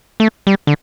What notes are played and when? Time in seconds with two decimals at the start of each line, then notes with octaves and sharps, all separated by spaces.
0.20 A3
0.47 G3
0.67 D3